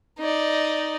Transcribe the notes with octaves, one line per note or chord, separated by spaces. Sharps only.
D#4 D5